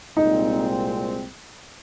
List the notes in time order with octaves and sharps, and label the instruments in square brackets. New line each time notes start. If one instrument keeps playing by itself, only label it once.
[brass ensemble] C2 A#2 G#3 C4 [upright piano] D#4